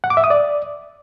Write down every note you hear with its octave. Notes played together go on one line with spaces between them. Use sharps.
F#5
D6
E5
D#6
D5